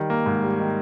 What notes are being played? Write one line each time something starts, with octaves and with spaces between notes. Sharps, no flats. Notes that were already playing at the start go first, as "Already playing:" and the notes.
Already playing: D#3 G3
A#3
G#2
G3
D#3